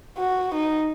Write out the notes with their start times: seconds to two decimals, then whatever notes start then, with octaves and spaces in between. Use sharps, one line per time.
0.18 F#4
0.55 D#4